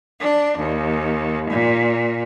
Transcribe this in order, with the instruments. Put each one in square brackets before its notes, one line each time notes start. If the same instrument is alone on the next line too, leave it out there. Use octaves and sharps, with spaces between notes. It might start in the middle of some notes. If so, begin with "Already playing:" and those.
[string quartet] D4
D#2
A#2